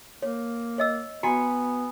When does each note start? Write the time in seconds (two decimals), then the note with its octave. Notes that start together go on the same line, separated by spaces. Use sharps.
0.22 A#3 C#5
0.78 C#5 D#5 E6
1.23 B3 F#4 G#5 A#5 B5 C#7